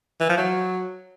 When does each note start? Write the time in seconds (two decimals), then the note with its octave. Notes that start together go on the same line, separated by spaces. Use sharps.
0.21 E3
0.29 F3
0.38 F#3